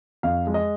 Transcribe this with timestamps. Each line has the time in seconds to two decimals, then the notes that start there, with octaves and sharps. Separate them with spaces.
0.23 F2 F5
0.47 G#3
0.54 D#5